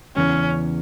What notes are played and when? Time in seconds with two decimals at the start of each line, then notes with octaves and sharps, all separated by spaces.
0.16 E2 C#3 E3 C#4